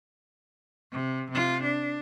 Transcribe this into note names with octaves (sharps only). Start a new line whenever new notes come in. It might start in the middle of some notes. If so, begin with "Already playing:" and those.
C3
C3 F4
D4